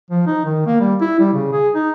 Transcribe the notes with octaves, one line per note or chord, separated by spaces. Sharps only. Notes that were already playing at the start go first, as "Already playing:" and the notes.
F3
D#4
D#3
A#3
G3
E4
G3
C#3
G#4
D#4